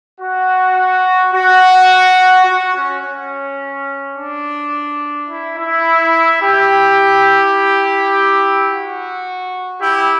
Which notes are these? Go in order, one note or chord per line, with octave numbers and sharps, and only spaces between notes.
F#4
F#4
F#4
C#4
C#4
D4
E4
E4
E4 G4
F#4
E4 G4